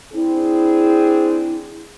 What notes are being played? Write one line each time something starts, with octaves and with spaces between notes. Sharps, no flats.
C4 D4 E4 G#4